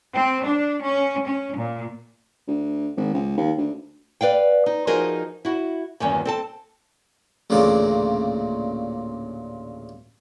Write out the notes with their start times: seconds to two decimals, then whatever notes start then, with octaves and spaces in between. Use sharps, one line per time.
0.13 C4
0.44 D4
0.84 C#4
1.27 C#4
1.57 A#2
2.47 D2
2.97 G#1
3.13 C#2
3.37 D#2
3.58 D2
4.21 B4 D5 F5 G5
4.66 D#4
4.87 F3 D#4 F#4 G#4 A#4 D#5
5.45 E4 F#4
6.00 E2 G2 D#3 F#3 A#3 C#4
6.25 C4 A4 A5
7.50 A1 D2 A#2 C#3 D5